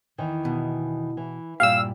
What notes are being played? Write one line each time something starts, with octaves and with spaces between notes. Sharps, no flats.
E2 D#3 E3
B2
E3
G2 A#2 G4 E5 F5 E6